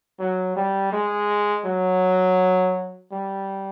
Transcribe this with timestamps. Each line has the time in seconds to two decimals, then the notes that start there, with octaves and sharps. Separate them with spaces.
0.20 F#3
0.56 G3
0.93 G#3
1.65 F#3
3.12 G3